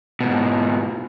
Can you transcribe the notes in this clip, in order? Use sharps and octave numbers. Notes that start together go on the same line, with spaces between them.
G#2 B2